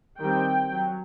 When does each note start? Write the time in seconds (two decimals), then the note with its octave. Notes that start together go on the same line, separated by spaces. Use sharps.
0.20 D#3 G3 C4 G5
0.72 F#3